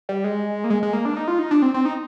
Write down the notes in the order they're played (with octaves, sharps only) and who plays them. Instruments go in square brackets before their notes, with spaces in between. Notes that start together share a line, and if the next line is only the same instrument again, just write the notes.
[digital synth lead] G3
G#3
A#3
G#3
G#3
A#3
D4
D#4
F4
D#4
D4
C4
C4
D#4